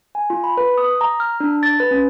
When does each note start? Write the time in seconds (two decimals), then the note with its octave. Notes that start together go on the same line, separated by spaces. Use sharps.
0.15 G#5
0.30 F4
0.44 B5
0.57 B4
0.77 D#6
1.01 A#5
1.20 F6
1.40 D4
1.63 A6
1.80 B4
1.91 C#4